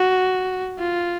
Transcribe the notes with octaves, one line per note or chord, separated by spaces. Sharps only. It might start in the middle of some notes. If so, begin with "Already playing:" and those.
Already playing: F#4
F4